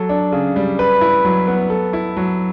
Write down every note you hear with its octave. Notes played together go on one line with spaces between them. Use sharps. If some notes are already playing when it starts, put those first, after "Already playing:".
Already playing: F#3 A4
D4
C#3
G3
B4
E4
F#3
B3
A4
E4
F#3